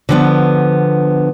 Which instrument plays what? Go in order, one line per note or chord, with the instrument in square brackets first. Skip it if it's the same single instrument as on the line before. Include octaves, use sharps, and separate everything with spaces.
[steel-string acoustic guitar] D3 F3 B3